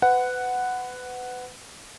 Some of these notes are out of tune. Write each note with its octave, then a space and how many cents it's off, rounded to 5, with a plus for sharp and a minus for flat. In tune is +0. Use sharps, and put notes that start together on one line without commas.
B4 +30 F#5 +0